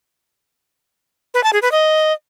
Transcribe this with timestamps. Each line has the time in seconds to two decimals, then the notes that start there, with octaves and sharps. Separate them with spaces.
1.34 B4
1.43 A5
1.53 G#4
1.62 B4
1.71 D#5